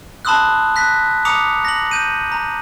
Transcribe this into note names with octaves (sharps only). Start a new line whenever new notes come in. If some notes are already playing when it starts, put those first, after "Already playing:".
A5 B5 C6 D#6 E6 F#6
F#6 A#6 B6
A#5 D6 D#6 C#7 F7
A#6 F#7
G6 D#7
A#5